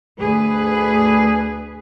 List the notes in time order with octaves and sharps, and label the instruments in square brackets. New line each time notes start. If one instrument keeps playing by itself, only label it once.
[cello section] D2 G#4 B4